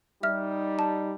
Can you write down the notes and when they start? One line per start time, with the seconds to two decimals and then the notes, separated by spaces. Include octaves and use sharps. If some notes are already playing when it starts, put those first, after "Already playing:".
0.23 G3 D#4 E5 F6
0.79 A5